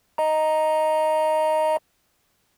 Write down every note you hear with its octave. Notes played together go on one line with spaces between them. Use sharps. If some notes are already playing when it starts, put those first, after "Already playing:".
D#5 A#5